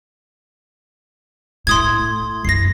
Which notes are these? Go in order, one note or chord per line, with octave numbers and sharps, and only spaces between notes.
A2 C6 D#6 G#6
F#2 E4 A#6 C7